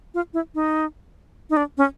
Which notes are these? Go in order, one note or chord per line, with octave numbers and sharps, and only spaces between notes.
F4
E4
D#4
D#4
D4
C#4